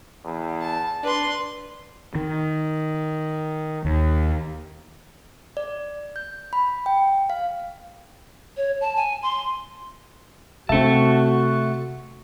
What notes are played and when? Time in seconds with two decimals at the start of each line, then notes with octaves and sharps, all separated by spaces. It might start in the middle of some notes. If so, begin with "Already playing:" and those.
0.25 E2
0.61 A5
1.03 D4 B4 C6
2.15 D#3
3.85 D#2
5.57 D5
6.16 G6
6.53 B5
6.86 G5
7.30 F5
8.57 C#5
8.81 A5
8.96 G#5
9.23 C6
10.69 C3 A3 C4 F#4 E5 A5